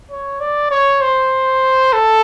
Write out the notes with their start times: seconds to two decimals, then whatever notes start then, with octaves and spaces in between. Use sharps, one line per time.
0.11 C#5
0.40 D5
0.71 C#5
1.01 C5
1.93 A4